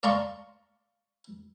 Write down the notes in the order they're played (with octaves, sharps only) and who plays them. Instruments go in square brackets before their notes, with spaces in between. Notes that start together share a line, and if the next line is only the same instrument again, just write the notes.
[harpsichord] D5 F5 A#5 C6 C#6